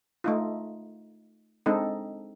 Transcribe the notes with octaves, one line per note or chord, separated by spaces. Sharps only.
A3 D#4 F4
G#3 C4 D4 D#4 A4